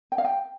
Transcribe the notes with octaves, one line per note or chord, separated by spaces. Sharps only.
G5
F5
G5